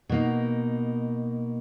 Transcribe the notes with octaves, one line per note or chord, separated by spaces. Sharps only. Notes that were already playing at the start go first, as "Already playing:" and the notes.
B2 A#3 D#4